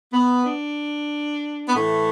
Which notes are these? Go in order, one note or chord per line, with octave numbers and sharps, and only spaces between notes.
B3
D4
B3
A2 E3 A3